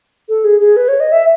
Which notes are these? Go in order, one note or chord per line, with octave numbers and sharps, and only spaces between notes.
A4
G#4
G#4
B4
C#5
D#5
E5